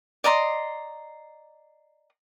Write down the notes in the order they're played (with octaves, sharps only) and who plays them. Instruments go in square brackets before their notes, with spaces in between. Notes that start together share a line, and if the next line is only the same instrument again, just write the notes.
[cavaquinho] D5 D#5 A#5 C6